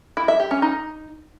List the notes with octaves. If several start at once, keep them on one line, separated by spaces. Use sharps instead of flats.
E4
E5
G4
C#4
D#4